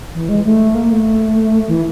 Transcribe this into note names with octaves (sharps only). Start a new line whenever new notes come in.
E3
G#3
A3
A#3
A3
E3